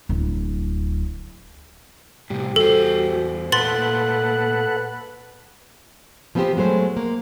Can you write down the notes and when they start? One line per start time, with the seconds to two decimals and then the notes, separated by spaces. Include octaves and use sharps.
0.09 D1
2.30 A2 C3 G3
2.56 E2 F#4 A4 C5
3.52 A#2 A3 A4 B4 F#5 C6 A6 F#7
3.77 A#3
6.35 F3 B3 C4 F4 G4 C5
6.57 F#3 G#3 A3 C5
6.97 A#3